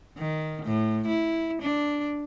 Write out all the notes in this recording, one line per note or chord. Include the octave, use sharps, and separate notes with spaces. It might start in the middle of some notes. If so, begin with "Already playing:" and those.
D#3
A2
E4
D4